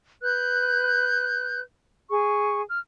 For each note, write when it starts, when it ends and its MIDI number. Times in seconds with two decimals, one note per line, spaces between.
0.22 1.60 71
0.22 1.60 90
0.22 1.60 91
2.10 2.62 68
2.10 2.62 85
2.71 2.80 89